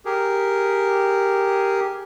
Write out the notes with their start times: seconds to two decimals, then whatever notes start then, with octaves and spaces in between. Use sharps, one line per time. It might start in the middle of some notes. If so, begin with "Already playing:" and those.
0.05 G4 G#4 A#4